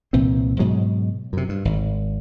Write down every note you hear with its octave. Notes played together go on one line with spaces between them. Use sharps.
C2 A#2 E3 C4
G#2 B2 F#3 G#3
F#2 C3
G2
G#1